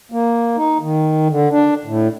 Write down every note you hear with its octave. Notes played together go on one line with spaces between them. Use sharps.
A#3
D#4
D#3
D3
D4
A2